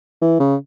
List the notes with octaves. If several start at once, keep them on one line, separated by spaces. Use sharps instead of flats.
E3
C#3